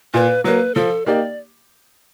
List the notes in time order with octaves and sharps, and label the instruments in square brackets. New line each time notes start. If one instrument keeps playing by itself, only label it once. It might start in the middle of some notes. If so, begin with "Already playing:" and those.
[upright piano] A#2 [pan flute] B4
[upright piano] F#3 A#3 [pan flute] B4
[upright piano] F3 [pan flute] A4
[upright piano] A#3 D#4 G4 [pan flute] D5